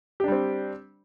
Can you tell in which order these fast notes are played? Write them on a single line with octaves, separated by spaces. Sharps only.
G4 D4 G3 C4